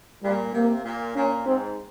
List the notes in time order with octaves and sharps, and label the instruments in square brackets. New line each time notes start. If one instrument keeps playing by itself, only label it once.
[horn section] A#2 [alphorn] G3
[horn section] C3 [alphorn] A#3
[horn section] A#2
[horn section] A#2 [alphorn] C#4
[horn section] G#2 [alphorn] C4